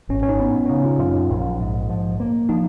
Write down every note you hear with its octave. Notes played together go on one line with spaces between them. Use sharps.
G#1 C#4
C#4
D#4
B3
C#4
C#3 D#4
F4
F#2 F4
D#4
A#1
G#2
F3
A#3
F3 D#4